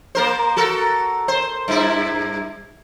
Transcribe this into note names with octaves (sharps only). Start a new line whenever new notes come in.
A#3 A#4 C5
F#4 A4 A#4
C5
G2 E4